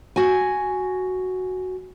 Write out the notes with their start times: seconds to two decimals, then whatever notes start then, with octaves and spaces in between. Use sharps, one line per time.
0.16 F#4 G#5